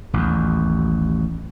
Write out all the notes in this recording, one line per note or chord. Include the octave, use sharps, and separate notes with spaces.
A1 D#2